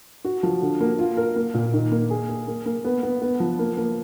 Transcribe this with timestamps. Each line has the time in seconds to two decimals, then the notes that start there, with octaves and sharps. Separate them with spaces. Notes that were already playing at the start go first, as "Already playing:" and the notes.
0.25 F#4
0.43 F3
0.62 D3
0.81 A#3
0.99 F4
1.17 A#4
1.36 A#3
1.54 A#2
1.73 D#3
1.92 A#3
2.10 G#4
2.29 G#4
2.47 A#3
2.66 A#3
2.85 B3
3.03 B3
3.22 B3
3.40 F3
3.59 A#3
3.77 A#3